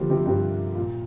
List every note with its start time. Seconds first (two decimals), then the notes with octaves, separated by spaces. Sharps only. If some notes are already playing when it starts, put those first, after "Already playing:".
Already playing: D3 F3 G3 A#3
0.10 C3 F3
0.26 G2 C3
0.75 A#2